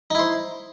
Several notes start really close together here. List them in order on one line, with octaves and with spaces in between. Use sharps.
D#4 E4 C5